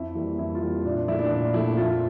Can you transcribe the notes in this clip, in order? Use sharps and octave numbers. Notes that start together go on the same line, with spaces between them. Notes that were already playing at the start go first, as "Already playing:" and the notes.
Already playing: F2 E4
E3 G3 A#3
F2 E4
F4
E3 G3 A#3 E4
A#2 D4
D4
F3 A3 E4
D4
A#2 D4
F3 A3 E4
F2 F4